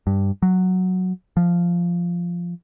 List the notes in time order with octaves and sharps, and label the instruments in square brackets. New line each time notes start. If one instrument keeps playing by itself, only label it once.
[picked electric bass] G2
F#3
F3